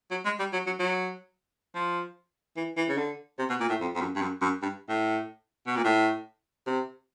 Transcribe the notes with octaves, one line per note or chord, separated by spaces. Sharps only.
F#3
G#3
G3
F#3
F#3
F#3
F3
E3
E3
C#3
D3
C3
B2
A#2
A2
F2
F2
F#2
G2
F#2
F#2
G2
A2
B2
A#2
A2
C3